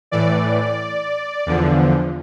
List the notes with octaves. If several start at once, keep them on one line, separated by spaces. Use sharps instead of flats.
A2 E3 D5
E2 D3 F3